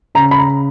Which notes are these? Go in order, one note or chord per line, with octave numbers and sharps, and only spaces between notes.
C#3 A#5
B5
A#5